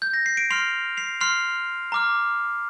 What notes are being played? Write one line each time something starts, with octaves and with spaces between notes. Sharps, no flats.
G6
A#6
C7
D7
C6 F6 C7 F7
C7 F7
C6 F6 C7 F7
A#5 D6 F6